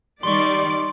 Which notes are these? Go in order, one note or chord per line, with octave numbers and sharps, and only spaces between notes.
D#3 G3 D5 C6 C#6